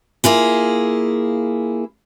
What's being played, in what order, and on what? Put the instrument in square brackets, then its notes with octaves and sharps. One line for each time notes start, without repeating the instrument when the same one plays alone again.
[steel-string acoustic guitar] A#3 E4 F4 G#4